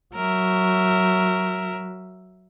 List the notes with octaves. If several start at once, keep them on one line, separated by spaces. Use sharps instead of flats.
F#3 A#4 E5